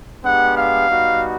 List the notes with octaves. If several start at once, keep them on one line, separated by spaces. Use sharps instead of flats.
G#3 B3 D4 G4 F#5
F5
G3 B3 D#4 F#4